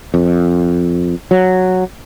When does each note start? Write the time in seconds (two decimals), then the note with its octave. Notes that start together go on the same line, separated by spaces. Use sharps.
0.14 F2
1.31 F#3